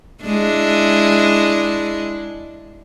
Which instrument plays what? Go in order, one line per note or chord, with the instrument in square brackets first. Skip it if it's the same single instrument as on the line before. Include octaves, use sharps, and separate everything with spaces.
[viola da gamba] G#3 D4 E4